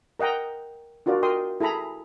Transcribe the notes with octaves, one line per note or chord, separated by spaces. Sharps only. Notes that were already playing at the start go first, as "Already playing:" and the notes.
A#4 D#5 F#5 G5 A#5
D4 F4 F#4 A#4 D5
A#4 D#5 G5 C6 D#6
E4 G#4 A4 A#5 B5